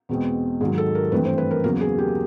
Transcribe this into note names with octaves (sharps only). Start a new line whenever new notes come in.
E2 B2 G#3 C4
G#2 D#3 F#3 G#4
A4
A#4
G2 E3 A3 C4 B4
C5
B4
A#4
E2 C#3 F#3 A#3 A#4
G#4
G4